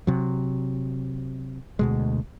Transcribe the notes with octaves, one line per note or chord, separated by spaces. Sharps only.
C3 F#3
D2 B2 G#3